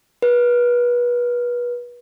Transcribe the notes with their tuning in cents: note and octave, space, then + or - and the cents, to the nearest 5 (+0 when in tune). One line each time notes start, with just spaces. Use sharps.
B4 -30